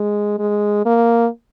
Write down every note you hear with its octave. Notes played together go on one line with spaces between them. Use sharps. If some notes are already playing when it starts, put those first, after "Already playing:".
Already playing: G#3
G#3
A#3